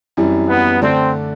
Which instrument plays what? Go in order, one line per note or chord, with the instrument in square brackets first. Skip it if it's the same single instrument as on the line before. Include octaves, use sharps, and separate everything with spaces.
[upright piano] F#2 E3 G3 C4 E4
[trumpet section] B3
[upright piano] D3 A3 D4 A4 D5 [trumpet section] C4